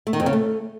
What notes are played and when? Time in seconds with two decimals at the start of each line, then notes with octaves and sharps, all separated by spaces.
0.07 A3
0.13 D#3
0.20 F2
0.26 C#3
0.33 A3